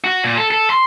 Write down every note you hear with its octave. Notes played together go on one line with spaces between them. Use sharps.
F#4
A#2
A4
A4
C6